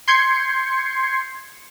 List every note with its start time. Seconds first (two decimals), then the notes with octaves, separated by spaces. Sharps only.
0.08 C6 G6 G#6 C7 C#7